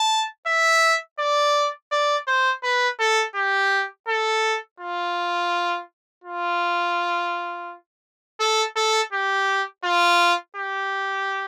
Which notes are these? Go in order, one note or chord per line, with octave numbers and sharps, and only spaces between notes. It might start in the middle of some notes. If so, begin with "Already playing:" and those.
Already playing: A5
E5
D5
D5
C5
B4
A4
G4
A4
F4
F4
A4
A4
G4
F4
G4